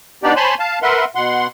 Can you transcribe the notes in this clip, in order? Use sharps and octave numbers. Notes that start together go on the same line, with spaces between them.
B3 D4 D#4 G4 D5
C5 C#5 G#5 A5 B5 C6
F5 A5
A#4 B4 E5 F#5 C6
B2 F#5 C6